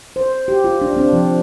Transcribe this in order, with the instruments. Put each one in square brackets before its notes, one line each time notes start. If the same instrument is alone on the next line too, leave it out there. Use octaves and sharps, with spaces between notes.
[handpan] C5
G4
F4
D4
D4
C4
F3